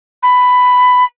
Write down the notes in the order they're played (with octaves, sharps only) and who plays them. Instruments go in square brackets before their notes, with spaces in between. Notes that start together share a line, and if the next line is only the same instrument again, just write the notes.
[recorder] B5